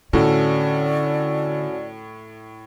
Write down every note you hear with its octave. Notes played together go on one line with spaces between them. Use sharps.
A2 D3 C#4 F#4 A4 D5